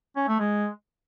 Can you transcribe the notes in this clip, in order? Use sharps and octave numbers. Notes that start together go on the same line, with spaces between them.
C#4
A3
G#3